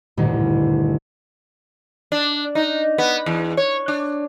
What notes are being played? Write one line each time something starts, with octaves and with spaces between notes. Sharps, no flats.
A1 D2 G2 A#2 D#3 E3
D4
D#4
B3
E2
C#5
D4